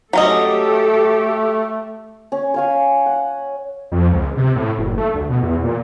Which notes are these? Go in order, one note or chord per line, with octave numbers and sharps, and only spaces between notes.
F#3 A3 C#4 G4 A4 D#5
C#4
C#5 F5 G#5
F#5
F2
C#2
C3
A2
F#1
A3
D2
B2
E2
A#2